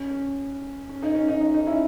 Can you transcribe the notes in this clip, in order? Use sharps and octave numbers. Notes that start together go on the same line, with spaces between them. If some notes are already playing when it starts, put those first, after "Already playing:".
Already playing: C#4
C#4
C#4
D#4
C#4
D#4
D#4
D#4
C#4 E4